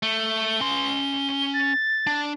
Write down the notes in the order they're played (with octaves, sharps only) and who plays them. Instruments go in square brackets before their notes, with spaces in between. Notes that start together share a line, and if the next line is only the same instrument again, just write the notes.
[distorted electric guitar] A3 [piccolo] G7
[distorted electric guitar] C#4 C6
[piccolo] A6
[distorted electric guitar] D4